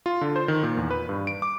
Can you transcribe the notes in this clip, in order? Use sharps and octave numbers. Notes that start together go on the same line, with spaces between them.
F4
D3
C5
D#3
A#2
E2
B4
G2
D7
D6